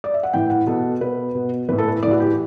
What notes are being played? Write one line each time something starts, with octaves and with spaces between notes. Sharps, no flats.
D5
E5
F#5
A2 E3 G5
F#5
B2 A4
B2 B4
B2
A2 E3 B4
A4
B4
A2 E3 F#4 D5
G4